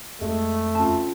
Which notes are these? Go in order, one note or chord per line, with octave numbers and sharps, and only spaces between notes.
F2 G#3 A3
C#3 C4 F4 A5